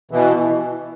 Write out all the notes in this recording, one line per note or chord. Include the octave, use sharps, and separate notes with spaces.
B2 E3